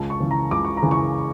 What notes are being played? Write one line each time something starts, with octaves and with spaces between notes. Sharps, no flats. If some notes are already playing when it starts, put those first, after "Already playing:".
Already playing: C#2 A5
C#6
C#3 E3
A#5
C#2 D6
C#6
A#5
C#3 E3
C#6